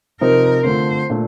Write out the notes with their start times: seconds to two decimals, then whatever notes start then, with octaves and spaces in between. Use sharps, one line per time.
0.21 C3 F3 C4 D#4 A#4
0.64 D3 A3 C4 F4 C5
1.10 A#2 A3 D4 F4